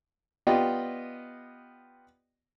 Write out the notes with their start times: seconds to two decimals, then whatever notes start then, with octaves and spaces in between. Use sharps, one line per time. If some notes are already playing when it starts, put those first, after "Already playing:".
0.47 B3 F4 G4 D5 D#5 G5